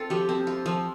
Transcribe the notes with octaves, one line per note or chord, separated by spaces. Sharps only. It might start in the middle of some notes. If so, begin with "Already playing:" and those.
Already playing: C4 F4 A4
F3 G4
C4
F4
F3